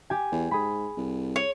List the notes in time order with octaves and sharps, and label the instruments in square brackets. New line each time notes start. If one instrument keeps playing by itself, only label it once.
[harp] G4 G#5
[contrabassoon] E2
[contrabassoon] G#2 [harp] G#4 B5
[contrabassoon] C2
[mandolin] C#5